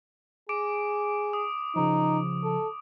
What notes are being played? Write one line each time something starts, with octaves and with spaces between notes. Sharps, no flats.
G#4 D6 D7
D#6
C#3 F3 D#4
A4